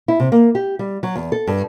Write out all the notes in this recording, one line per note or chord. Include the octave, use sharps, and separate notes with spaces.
E4
C3
A#3
G4
G3
F#3
E2
A4
G2